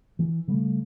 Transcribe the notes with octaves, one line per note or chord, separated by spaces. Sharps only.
E3
C#3 G3 A3